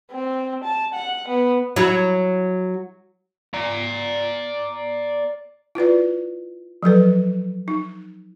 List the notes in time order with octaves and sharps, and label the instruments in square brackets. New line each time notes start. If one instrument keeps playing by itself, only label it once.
[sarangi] C4
A5
F#5
B3
[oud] F#3 E4
[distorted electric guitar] D5 A#5
[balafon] E4 F4 B4 D5
F3 F#3 A4 B4
D#4